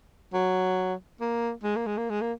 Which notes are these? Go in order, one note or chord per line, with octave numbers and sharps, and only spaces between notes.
F#3
A#3
G#3
A#3
G#3
A#3
G#3
A#3